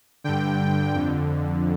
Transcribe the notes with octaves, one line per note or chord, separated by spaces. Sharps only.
G2 D3 G5
F2 D3